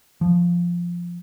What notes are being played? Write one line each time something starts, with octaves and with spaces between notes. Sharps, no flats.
F3